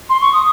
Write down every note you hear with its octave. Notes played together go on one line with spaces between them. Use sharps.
C6
C#6
D#6